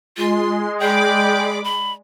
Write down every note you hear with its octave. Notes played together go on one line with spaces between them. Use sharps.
G#3 F4 C6
G#4 D5 G5 B5 D6
B5